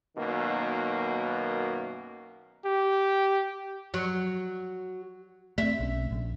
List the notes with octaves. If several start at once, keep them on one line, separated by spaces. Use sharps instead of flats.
F#2 B2 D#3 A#3
G4
F#3
A3 C4 E5
B1 C#4
A#1